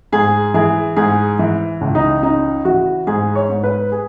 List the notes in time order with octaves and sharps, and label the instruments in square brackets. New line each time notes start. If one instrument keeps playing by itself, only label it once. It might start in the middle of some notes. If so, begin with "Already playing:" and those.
[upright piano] G#2 G#4
E3 G#4
G#2 G#4
E3
C#2
D#4
C#3 D#4
E3 F#4
G#2 G#4
C#5
G#2
B4
G#4